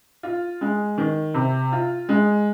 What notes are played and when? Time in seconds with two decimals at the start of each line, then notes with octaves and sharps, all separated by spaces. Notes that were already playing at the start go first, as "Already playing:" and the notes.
0.23 F4
0.61 G#3
0.98 D#3
1.34 C3
1.72 F4
2.09 G#3